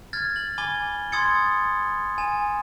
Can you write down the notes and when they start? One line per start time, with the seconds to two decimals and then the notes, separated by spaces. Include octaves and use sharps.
0.13 F6 G#6 A6
0.36 F#7
0.58 G#5 B5 D6 G#6 G7
1.12 C6 D#6 E6 G#6 A6 C#7
2.18 G#5 E7